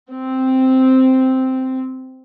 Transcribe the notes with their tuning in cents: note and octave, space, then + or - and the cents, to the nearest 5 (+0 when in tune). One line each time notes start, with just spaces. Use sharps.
C4 -5